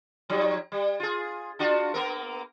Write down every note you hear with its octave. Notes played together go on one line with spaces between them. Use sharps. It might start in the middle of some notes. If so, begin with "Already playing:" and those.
F3 G3 D#4
G3
F4 G#4
D4 F4 F#4
A#3 B3 A#4